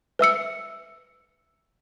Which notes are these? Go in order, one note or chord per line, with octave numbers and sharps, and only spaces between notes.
B4 E5 E6 C#7